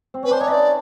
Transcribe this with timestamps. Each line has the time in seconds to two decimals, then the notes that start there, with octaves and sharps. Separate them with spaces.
0.14 C4
0.23 C#4 B4
0.31 D4 C5
0.40 D#4 C#5
0.48 E4 E5
0.52 D5